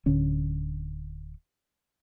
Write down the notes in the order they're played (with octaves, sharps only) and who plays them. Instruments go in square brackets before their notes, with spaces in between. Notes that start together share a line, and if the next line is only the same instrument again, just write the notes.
[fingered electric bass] D1 D3 C#4